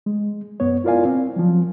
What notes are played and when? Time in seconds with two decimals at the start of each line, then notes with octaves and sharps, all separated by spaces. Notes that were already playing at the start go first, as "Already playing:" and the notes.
0.06 G#3
0.60 F#2 B3 C#5
0.84 E4 F4 A#4 D5 F5 G#5
1.05 C4
1.36 F3 F#3